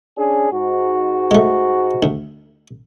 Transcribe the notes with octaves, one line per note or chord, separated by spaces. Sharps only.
C#4 D4 G#4
G#2 F#4
G#3 A3
D2